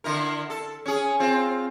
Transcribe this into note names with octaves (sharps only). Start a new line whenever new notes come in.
D3 E4 A#4
A4
C#4 G#4
C4 F4